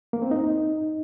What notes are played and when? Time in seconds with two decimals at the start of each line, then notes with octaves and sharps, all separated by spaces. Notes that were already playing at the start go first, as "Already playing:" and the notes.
0.13 A#3
0.22 C4
0.31 D#4